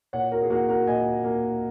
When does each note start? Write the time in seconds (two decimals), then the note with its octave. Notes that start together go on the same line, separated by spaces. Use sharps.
0.13 A#2 C#5 F#5
0.32 F#4 A#4
0.43 G#4
0.50 A#3 F#4 A#4
0.69 F#4 A#4
0.87 A#2 D#5 G#5
1.24 A#3